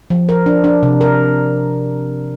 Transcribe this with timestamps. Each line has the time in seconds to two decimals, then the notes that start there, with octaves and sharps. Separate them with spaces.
0.10 F3
0.29 A#4
0.46 D4
0.64 D4
0.83 C3
1.01 A#4